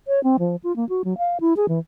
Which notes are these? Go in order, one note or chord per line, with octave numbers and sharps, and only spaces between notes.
C#5
C4
F3
F4
A#3
F#4
F#3
F5
E4
G#4
E3